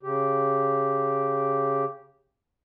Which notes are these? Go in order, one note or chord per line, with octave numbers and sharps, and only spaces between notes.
C#3 G4